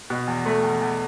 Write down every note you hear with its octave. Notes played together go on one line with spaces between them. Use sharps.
B2
E2
A3
E2
E2